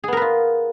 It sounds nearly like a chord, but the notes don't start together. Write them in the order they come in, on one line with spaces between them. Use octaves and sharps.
G#4 B3 A#4 B4 F4